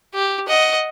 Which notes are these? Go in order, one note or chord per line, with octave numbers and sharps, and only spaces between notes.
G4
D#5 F#5